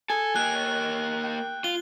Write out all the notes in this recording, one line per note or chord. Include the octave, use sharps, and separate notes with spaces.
A4 G#5
A#3 G4 F#6
C#5
G5
F4 G7